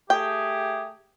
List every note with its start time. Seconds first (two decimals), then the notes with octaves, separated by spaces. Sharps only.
0.10 A3 G4 G#4 G5